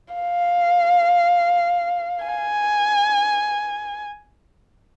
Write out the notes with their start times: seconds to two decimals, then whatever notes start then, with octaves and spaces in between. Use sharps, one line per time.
0.14 F5
2.25 G#5